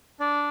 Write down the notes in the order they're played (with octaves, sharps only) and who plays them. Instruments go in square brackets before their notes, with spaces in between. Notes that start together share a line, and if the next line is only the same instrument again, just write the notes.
[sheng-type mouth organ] D4 D5